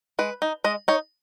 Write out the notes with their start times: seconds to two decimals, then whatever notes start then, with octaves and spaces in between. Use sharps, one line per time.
0.19 G#3 B4
0.42 D#4
0.64 G#3 D#5
0.88 D#4 C#5